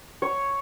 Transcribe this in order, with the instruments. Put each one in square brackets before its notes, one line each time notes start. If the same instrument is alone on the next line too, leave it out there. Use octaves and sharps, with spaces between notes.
[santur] C#5